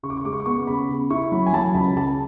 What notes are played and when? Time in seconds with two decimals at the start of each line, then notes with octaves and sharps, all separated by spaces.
0.03 C#3 C#6
0.10 D6
0.17 C#6
0.25 G#3 D6
0.33 C#6
0.40 D6
0.46 B3 C#6
0.67 C#3 B5
0.89 C#3
1.10 E4 C#6
1.32 F#3 B5
1.46 G#5
1.53 F#3 A5
1.74 C#2 B5
1.96 C#3 A5